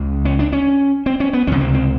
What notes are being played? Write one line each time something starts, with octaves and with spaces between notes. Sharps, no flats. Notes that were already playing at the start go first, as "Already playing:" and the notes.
Already playing: C#2 C#3
C#4
D4
C#4
C4
C#4
B3
C#2 C3 C#4
C4
C4